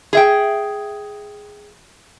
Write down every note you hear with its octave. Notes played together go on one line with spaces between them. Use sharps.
G#4 E5 G5